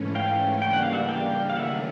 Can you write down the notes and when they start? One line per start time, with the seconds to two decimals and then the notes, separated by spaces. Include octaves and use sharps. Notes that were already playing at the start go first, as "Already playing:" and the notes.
Already playing: G#2 E3 A3 C#4
0.15 F5 G5
0.62 C#3 E3 G3 A#3 D4 G5
0.73 F#5
0.83 F5
0.93 E5 F#5
1.08 F5 G5
1.50 F5
1.56 D#3 F#3 A3 C#4 E5 F#5